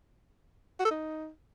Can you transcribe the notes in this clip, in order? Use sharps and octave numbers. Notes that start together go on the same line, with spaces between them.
F#4
A4
D#4